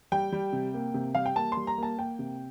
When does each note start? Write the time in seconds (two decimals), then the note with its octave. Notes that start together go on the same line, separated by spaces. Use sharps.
0.12 G3 G5
0.32 G3
0.53 C3
0.74 A#3
0.94 C3
1.15 G3 F5
1.26 G5
1.36 A#3 A5
1.52 G3 C6
1.67 A#5
1.78 A#3 A5
1.98 A#3 G5
2.19 C3